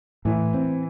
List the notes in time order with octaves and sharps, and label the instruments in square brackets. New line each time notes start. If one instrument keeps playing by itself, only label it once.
[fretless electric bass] A2 [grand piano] E3 E4
[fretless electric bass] C4